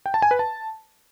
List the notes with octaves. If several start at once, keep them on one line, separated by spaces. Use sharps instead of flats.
G5
A5
G#5
B4
A5